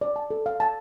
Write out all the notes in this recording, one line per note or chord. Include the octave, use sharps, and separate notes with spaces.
D5
A5
A4
F5
A5